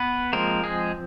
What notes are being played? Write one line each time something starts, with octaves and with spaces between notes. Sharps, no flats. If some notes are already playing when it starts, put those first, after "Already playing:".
Already playing: B3 B4
F3 G#3 A#3 C4 A#4
G#3 G#4